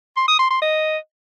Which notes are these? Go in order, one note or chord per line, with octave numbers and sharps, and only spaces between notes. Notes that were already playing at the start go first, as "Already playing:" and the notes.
C6
D#6
C6
C6
D#5